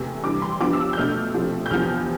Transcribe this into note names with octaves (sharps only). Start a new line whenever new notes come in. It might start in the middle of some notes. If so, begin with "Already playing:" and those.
Already playing: E2 C3 A3
C3 E3 G3 D4 D6
C6
G2 F3 B3 D4 D6
E6
G6
B2 A3 D4 F6
C3 F3 A3 C4
G6
E2 C3 F3 B3 F6